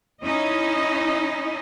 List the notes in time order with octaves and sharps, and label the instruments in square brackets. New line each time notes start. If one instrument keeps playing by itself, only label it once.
[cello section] C#4 D#4 E4 D#5